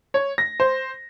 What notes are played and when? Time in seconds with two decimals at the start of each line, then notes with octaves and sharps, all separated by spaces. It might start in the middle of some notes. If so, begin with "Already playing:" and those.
0.14 C#5
0.38 A#6
0.60 C5